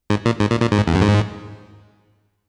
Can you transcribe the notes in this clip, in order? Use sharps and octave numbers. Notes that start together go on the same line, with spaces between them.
G#2
A#2
G#2
A#2
A#2
G#2
E2
F#2
G#2